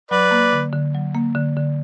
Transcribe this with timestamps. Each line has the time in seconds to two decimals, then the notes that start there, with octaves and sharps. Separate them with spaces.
0.11 F#3 B4 D5
0.31 A#3
0.53 D3
0.73 D3
0.95 F#3
1.15 A#3
1.35 D3
1.57 D3